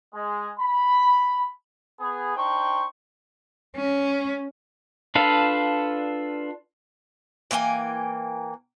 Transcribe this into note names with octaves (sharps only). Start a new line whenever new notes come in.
G#3
B5
B3 G#4
D4 D#4 C5 G5 C#6
C#4
D4 F4 A4 B4 F5
E3 A#3 G5 G#5